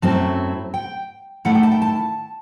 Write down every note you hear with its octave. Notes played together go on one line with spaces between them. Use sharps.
F#2 F#3 A3 C4 E4 A5
G5
D#3 A3 E4 F#5
G5
A5
G5
A5